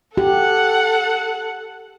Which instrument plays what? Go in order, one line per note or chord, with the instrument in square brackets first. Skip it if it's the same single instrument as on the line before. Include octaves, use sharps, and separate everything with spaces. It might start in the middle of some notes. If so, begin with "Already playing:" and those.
[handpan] G4 [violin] A4 F#5